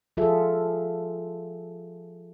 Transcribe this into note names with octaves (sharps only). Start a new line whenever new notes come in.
F3 F4 G#4 A4 E5